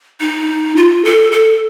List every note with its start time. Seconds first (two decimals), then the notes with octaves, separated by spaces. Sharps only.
0.20 D#4
0.76 F4
1.05 A4
1.32 A4